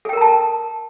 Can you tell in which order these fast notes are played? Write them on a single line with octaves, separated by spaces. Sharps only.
A4 G5 A#4 A#5 A5